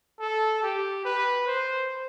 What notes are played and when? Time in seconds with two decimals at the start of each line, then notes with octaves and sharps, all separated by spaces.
0.20 A4
0.63 G4
1.05 B4
1.47 C5